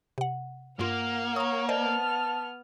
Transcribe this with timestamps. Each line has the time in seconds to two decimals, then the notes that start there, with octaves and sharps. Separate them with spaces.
0.18 C3 F#5
0.79 G2 A#3 F4 F#5 F6
1.36 C#5 A#5 D#6
1.69 B3 C5 D5 D#5 A5 F6